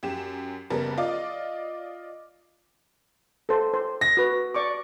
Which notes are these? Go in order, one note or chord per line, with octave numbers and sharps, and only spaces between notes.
F#2 G4 E7
F#1 G3 B3 A#4 A5
F4 D5 D#5 F5 D6
A4 C5
C5
A#6
F#4 B4
D5 C#6 D6